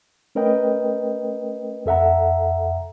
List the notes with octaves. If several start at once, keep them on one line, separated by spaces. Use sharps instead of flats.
A3 C#4 A#4 B4 D#5 G5
F2 A4 E5 F#5 A#5